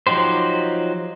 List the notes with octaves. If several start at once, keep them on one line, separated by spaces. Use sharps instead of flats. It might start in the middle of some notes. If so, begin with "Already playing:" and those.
F3 F#3 D#4 G4 C5